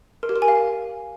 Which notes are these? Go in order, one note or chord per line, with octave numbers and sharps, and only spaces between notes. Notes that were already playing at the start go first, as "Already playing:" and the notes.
A#4
G4
A#4
G#5
F5